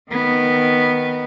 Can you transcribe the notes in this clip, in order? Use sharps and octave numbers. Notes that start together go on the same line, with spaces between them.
D#3 B3